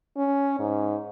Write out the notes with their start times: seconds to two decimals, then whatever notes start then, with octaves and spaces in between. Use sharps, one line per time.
0.17 C#4
0.60 G#2